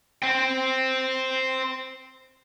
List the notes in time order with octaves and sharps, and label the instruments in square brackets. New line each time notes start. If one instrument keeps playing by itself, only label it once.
[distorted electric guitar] C5 G5